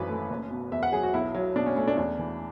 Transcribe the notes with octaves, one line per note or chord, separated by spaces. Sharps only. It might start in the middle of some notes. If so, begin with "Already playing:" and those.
Already playing: G#1 F#2 E3 B4
A3
F#1
B2
E2 E5
F#5
F#3 G#4
F#4
B1 E4
F#3
B2 D4
C#4
A3 C#4
D4
E2 D4
E3